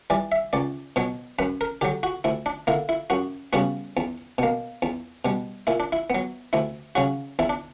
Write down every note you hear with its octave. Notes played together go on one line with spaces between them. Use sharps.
E3 G3 D5
E5
C#2 D5
B2 F#3 C#5
F#2 B4
A#4
D3 F#3 G4
F#4
D2 E4
D4
D3 A#3 E4
E4
F#2 F#4
C#3 G3 B3 F#4
E2
B2 A#3
E2
B2 G3
A#2 E4
D4
E4
F#3 B3
D2 E4
C#3 F#3 F#4
E2 E4
D4